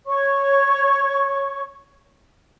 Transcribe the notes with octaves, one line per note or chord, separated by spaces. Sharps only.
C#5 C#6